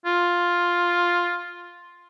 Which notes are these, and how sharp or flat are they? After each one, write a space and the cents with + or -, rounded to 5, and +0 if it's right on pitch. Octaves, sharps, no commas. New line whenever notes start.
F4 +5